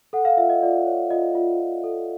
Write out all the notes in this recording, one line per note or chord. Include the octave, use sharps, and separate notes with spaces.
A4 F#5
F5
F4 E5
D#5
F4 D5
C#5
F4 D#5
F4
F4
A4